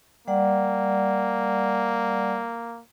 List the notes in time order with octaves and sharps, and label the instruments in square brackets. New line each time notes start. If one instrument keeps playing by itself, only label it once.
[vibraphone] G3 D5 F#5 [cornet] A#3